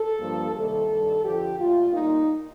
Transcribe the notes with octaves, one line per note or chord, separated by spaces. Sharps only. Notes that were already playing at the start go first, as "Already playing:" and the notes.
Already playing: A4
G2 F3 A#3
C3 D#3 G3 A#3 A4
G2 D#3 G3
F2 D3 F3 G4
A#2 A3 F4
A#2 G3 A#3 D#4